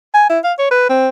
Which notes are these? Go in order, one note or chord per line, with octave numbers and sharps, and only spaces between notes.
G#5
E4
F5
C#5
B4
C4